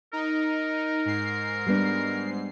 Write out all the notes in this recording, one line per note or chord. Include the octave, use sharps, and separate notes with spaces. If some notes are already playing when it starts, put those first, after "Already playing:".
D#4 A#4
G#2 C7
G3 B3 D4